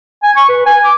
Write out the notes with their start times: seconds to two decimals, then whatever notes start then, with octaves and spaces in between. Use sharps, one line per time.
0.23 G#5
0.36 C#6
0.49 B4
0.66 G#5
0.85 D6